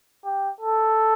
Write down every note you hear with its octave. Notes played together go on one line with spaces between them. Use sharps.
G4
A4